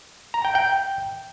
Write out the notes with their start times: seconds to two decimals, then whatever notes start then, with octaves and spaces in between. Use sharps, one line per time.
0.34 A#5
0.45 G5
0.55 G5